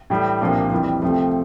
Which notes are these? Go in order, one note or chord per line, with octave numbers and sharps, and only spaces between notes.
A2 E3 G3
C2 A#2 F3 A#3 D4
F2 E3 G3
C2 C3 F3 A3